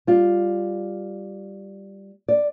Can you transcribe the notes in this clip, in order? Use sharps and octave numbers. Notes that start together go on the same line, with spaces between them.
G3 F4
D5